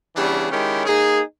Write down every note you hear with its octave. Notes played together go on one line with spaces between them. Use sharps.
C#3 E3 G3 B3 D4
D#3 G#3 C#4 E4 G4
A#3 D#4 G#4